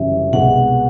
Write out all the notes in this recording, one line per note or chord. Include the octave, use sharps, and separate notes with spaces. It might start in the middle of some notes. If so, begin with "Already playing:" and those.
Already playing: G1 F#2 C#3 E3 G3 E5
C2 B2 G#3 B3 F#5